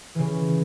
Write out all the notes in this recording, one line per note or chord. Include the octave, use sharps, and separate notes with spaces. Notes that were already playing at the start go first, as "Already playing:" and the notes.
C#3 E3